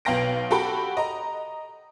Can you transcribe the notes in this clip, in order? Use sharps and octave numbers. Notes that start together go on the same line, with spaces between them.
B1 B3 F5 G5 A#6 D7
F#4 G4 A4 G5 B5
D#5 A#5